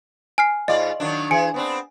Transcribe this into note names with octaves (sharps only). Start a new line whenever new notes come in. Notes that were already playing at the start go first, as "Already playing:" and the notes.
G#5 F6 C7
G#2 F4 D5 D#5
D#3 F#3 D4
E3 G#4 G#5 C#7
B3 C4 D4